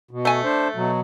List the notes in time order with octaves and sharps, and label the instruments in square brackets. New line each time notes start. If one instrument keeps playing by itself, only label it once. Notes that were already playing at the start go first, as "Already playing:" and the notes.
[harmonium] B2
[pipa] A3 G#5
[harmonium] D4 C5
B2 F#3